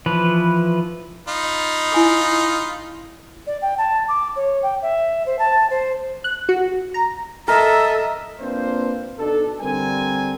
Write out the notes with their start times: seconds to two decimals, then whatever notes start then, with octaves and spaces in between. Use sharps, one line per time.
0.06 E3 F3 B4
1.28 D#4 F4 B5
1.92 E4 G#5 D6
3.47 D5
3.62 G5
3.78 A5
4.08 D6
4.36 C#5
4.63 G5
4.82 E5
5.26 C5
5.39 A5
5.70 C5
6.24 F#6
6.49 F#4
6.94 A#5
7.48 A4 A#4 D#5 E5
8.40 A#3 C4 D4 F4 B4 C5
9.19 B2 D4 D#4 A4
9.61 D3 G3 C4 D4 A#4 G#5